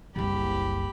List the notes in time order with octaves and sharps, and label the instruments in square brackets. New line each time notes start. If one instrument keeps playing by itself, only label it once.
[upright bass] F#1 C2 [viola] G4 B5